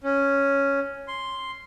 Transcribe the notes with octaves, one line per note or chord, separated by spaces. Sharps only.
C#4
C6